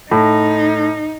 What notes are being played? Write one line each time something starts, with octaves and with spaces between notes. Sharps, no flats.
A2 D#4